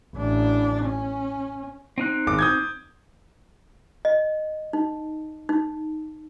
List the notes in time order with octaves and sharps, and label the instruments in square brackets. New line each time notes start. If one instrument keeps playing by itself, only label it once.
[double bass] A1 D4
C#4
[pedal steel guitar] C4 D#4 F#6
[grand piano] G#1 D6
D#6 G6 G#6
[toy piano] D#5
D#4
D#4